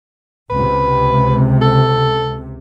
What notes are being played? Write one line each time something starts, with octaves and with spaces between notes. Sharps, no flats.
C#2 C3 B4
A4